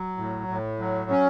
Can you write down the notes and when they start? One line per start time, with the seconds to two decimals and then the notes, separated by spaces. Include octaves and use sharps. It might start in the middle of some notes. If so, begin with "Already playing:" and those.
Already playing: F#3
0.17 A2
0.48 A2
0.79 F#3
1.10 C#4